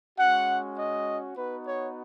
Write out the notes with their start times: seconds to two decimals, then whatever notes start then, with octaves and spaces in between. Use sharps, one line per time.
0.19 G#3 C#4 F#4 F#5
0.78 D#5
1.37 B3 D#4 F#4 B4
1.68 C#5